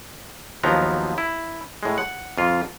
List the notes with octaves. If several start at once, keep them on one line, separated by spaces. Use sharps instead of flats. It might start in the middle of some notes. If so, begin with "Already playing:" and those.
D#2 F3 F#3 B3 A#5
E4
A2 G#3
F#5
F2 F4